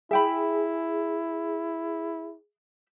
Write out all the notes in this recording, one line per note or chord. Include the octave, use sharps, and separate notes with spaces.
E4 G#4 E5 G5 B5